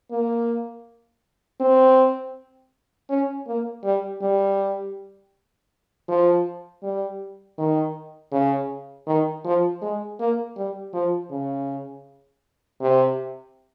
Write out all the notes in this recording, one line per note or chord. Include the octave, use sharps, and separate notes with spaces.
A#3
C4
C#4
A#3
G3
G3
F3
G3
D#3
C#3
D#3
F3
G#3
A#3
G3
F3
C#3
C3